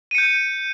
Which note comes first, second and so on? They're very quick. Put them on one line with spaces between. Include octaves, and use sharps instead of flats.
D#7 C#7 G6